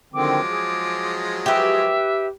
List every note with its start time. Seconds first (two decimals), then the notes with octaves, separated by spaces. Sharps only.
0.14 D3 D#3 F3 F#3 G#3 C4 D6
0.51 G#4
1.46 G4 B4 E5